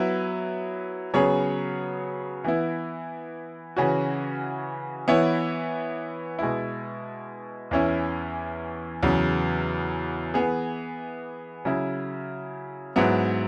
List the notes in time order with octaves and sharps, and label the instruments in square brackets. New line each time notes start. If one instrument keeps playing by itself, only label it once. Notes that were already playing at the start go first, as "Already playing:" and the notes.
Already playing: [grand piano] F#3 B3 E4 B4
C#3 F#3 B3 G#4 C#5
E3 B3 E4
C#3 E3 C#4 F#4
E3 B3 E4 C#5
B2 G#3 E4
E2 E3 C#4 E4
E2 C#3 F#3
E3 B3 G#4
C#3 F#3 E4
G#2 F#3 B3 E4